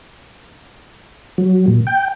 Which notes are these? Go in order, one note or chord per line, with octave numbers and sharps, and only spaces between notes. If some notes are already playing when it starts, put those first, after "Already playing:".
F#3
A#2
G5